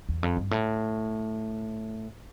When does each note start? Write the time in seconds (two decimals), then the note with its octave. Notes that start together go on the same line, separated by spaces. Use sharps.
0.09 E2
0.23 F2
0.37 G2
0.51 A2